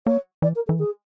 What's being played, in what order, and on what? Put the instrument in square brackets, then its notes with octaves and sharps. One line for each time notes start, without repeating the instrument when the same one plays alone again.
[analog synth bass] A#3 [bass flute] C#5
[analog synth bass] E3 [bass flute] D5
[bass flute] A#4
[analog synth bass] E3 [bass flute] A4
[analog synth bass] D#3 [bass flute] G#4